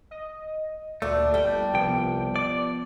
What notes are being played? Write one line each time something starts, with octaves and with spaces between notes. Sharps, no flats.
D#5
D2 A#2 A3 D4
G1 G3 D4 G5
C2 F3 B3 G5
D5